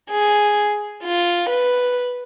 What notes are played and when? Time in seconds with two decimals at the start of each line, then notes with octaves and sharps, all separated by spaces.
0.10 G#4
1.04 F4
1.49 B4